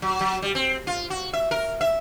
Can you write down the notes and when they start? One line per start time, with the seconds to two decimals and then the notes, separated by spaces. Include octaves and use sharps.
0.02 F#3
0.21 F#3
0.42 G3
0.55 C4
0.87 F4
1.10 F#4
1.33 E5
1.51 A#4
1.81 E5